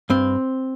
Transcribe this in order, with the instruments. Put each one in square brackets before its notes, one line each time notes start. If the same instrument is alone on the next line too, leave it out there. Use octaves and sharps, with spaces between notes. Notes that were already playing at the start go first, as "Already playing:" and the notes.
[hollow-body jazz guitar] G2 C4